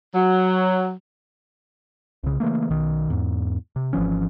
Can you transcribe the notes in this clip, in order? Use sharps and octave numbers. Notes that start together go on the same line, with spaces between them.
F#3
C2 C#3
C#3 E3 A3 A#3
B1 D#3
E2 G#2
C3
G#1 E3 F3 C#4